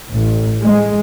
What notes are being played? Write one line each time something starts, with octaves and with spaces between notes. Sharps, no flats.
A1
G#3